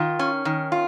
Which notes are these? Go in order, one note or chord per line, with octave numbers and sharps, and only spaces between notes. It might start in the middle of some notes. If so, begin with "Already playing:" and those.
Already playing: D#3 F4
C#4
D#3
F4